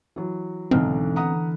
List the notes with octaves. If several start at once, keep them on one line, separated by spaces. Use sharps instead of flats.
E3 F#3
B1 G#2 D3 E3 C4 F6
B3 F#5 A#5 D#6